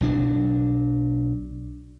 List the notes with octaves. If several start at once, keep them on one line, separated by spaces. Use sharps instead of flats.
B1 F#3 D4